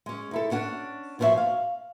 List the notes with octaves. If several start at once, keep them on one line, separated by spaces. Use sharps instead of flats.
G#3 C#4
D#4 E4 A4
C#4 D4 F#5
D#2 B2 F3 A#4 C#5 E5
F5